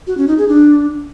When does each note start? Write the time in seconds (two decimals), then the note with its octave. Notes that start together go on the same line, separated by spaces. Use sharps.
0.07 F#4
0.17 C#4
0.28 D#4
0.38 G#4
0.48 D4